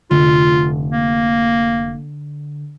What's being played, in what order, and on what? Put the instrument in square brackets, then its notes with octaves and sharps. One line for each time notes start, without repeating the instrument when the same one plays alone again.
[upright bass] F1 [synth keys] D3 [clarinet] F4
[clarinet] A#3